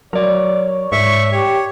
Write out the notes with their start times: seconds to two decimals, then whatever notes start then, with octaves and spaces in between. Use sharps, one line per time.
0.13 F#3 A#4 C#5 D5
0.92 G#2 C#5 E5 C#6
1.32 G4 C#5